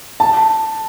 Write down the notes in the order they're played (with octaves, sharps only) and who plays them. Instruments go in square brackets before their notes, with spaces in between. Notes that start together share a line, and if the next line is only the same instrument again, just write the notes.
[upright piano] A5